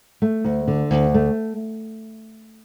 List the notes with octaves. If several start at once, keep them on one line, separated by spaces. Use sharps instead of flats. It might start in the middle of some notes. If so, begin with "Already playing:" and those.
A3
D2
D3
D2
A3